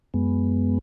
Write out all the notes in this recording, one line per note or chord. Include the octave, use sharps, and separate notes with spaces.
F#2 G#3 B3